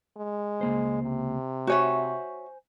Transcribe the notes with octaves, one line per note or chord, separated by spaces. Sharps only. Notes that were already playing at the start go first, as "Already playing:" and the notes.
G#3
C#2 A#3 C5
C3
F#4 C5 C#5 E5 G#5